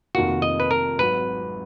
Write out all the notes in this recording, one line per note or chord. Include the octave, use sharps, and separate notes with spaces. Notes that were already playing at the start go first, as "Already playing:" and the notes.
F1 F2 D#3 A#3 F4 F#4
D#5
B4
A#4
G#1 G#2 F#3 B4